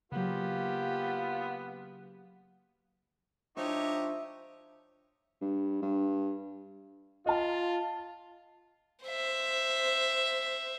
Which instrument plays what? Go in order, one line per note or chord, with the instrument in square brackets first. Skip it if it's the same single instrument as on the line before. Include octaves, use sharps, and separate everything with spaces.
[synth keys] C#3 F#3 [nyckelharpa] A#3 G4 [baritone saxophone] B3 [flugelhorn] F4
[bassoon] F3 [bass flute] D4 [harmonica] D#4 G4 C#5 [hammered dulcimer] E5
[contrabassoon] G2
G2
[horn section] F4 [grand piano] D#5 A5
[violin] C5 E5